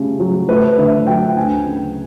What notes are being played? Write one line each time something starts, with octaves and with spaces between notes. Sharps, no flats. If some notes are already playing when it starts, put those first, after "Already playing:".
Already playing: C#3 G3 A3
F#3
A3 B4
D3 E5
F#3 G5
D2 G#5
C#3